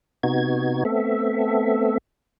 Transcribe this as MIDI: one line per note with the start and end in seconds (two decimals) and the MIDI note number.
0.23 0.84 48
0.23 0.84 59
0.23 0.84 63
0.23 0.84 66
0.23 0.84 92
0.85 1.98 57
0.85 1.98 59
0.85 1.98 60
0.85 1.98 69
0.85 1.98 76